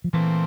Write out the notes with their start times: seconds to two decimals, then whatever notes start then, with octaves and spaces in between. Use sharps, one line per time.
0.04 F3
0.13 A#2 E3 A3 C4